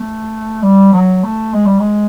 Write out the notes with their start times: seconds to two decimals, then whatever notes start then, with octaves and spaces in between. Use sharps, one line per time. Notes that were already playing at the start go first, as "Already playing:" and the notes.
Already playing: A3
0.62 G3
0.93 F#3
1.23 A3
1.53 G#3
1.66 G3
1.80 G#3